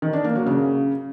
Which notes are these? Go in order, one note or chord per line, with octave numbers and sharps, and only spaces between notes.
D#3
D4
A#3
F#3
C#3